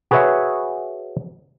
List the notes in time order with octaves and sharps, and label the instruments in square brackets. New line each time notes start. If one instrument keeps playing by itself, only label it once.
[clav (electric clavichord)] F#4 G#4 B4 C#5 E5 F#5